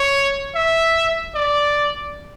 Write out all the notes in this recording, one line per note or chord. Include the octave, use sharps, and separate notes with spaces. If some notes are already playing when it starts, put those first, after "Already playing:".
Already playing: C#5
E5
D5